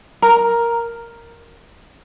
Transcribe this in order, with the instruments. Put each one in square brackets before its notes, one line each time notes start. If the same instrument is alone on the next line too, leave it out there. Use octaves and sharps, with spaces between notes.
[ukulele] A#4 A#5